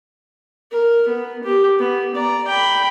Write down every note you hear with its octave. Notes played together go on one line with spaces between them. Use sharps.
A#4
B3
G4
B3
D5 A#5
G5 B5